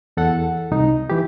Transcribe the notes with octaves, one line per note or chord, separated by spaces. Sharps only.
E2 A4 F#5
C2 D#4
E3 G4